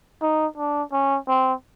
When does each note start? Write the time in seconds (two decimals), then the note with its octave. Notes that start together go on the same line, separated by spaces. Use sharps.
0.22 D#4
0.57 D4
0.92 C#4
1.28 C4